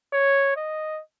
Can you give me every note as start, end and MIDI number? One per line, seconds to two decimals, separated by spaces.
0.13 0.54 73
0.56 1.01 75